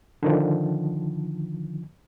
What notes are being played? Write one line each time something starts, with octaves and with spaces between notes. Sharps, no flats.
D3 D#3 F3